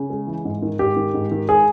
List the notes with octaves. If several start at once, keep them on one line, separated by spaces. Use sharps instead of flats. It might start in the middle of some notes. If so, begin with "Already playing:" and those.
Already playing: C#3
G#3
E3
G#2
D#3
G#2 G4
D#3
G#2
D#3
G#3 G#4